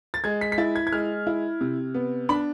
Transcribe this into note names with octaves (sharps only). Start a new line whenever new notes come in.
A6
G#3 G#6
B6
B6
E4 A6
G#6
G#6
G#3 F6
E4
C3
B3
D4 B5